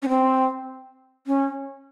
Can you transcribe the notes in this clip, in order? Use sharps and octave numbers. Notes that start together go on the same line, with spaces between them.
C#4
C4
C#4